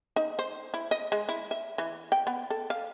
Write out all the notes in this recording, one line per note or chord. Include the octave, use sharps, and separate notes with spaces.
D#4
C5
E4
D#5
G#3
E4
E5
E3
G5
B3
A4
F5